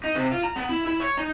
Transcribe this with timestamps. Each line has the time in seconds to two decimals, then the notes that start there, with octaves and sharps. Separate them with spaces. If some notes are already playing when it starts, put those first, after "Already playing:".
0.04 D#4
0.15 C3
0.32 F4
0.44 A#5
0.56 B3
0.69 E4
0.87 E4
1.00 C#5
1.17 D#4